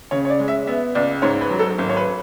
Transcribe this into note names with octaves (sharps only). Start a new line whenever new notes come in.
C#3 C#5
C#5
D5
G#3
E5
B3 E5
C#2 D5
G#2 C#5
B4
F#3
A4
G#1
C#5
B4